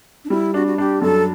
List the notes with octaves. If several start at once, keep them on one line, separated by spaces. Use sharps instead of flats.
D4
G3 E4
D4 F#4
F#4
D4 G4
F#2 A4